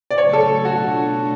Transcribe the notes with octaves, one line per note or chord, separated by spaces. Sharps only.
D5
C#3 F#3 A3 C#4 C#5
A4
B2 A3 D4 F4 F#4